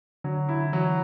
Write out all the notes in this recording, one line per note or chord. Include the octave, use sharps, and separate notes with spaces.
D3 F#3
E4
E3 F#3